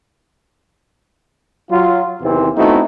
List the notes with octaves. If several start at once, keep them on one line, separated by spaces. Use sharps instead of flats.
F#3 F4
E2 C3 D#3 E3 C4
A3 B3 C4 D#4 E4 F#4